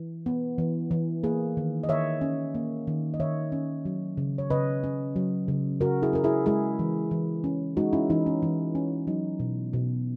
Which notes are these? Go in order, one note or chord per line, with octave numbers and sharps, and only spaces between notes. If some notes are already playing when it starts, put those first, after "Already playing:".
Already playing: E3
B3
E3
E3
A#3 G#4 B4
D#3
D#5
D#3 C#5 E5
C#4
A#3
D#3
D#5
D#3 C#5 E5
C#4
F#3
C#3
C#5
C#3 B4 D#5
C#4
F#3
C#3
C#3 F#4 A#4
E4 G#4
C#4 A#4
E4 G#4
G#3 E4 G#4
E3
E3
C#4
G#3 D#4 F#4
C#4 E4
E3 D#4
C#4
E3
C#4
F#3 D#4
B2
B2